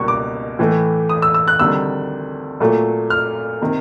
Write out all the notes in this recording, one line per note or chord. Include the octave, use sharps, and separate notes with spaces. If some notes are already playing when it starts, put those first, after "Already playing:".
Already playing: C#2 B2 G3 A#3 C#6
D6
A2 E3 A3
D#6
E6
E6
F#6
D2 C3 D#3 G3 E6
A#2 F#3 A3
F6
C3 D#3